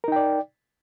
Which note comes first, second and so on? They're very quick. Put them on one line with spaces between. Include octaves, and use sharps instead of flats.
A#4 D#4 G5 D5